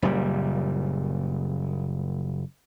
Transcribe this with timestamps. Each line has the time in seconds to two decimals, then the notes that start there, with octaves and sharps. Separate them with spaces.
0.02 F#1 A#2 G3